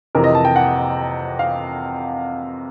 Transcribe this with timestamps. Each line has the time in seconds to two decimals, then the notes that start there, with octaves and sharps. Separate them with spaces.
0.15 F2 C3 E3 A#4
0.24 D#5
0.35 A5
0.45 G5
0.56 F#5
1.39 F5